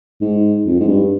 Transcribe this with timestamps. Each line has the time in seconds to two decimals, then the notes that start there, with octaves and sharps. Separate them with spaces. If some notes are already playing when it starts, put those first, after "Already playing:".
0.21 G#2
0.66 F2
0.81 G#2
0.88 G2